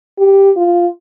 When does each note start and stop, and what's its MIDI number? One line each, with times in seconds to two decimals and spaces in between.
0.19 0.51 67
0.56 0.87 65